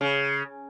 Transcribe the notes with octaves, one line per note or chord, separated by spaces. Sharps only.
C#3